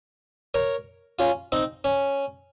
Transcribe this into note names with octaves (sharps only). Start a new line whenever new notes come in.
A#4 C#5
C#4 F4
C4 D#4
C#4